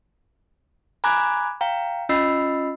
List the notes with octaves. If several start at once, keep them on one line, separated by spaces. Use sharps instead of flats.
G#5 A#5 B5 D6 F#6 G#6
F5 G5 A#5
C#4 F4 D#5 B5 E6 C7